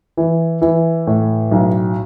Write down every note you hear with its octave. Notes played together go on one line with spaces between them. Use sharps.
E3
E3
A2
B1